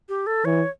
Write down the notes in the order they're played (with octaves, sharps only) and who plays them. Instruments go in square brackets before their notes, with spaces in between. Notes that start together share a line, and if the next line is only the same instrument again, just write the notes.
[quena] G4
A4
[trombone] E3 [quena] C#5